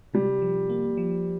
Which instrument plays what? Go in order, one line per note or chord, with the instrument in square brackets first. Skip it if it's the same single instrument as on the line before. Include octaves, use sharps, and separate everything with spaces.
[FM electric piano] C3 [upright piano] G3
[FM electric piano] F3
A#3
F3